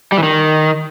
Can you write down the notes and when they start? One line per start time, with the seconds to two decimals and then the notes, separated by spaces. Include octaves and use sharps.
0.12 G3
0.18 E3
0.23 D#3